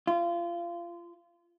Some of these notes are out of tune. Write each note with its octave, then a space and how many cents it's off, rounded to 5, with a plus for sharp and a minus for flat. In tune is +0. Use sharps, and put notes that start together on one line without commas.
F4 -25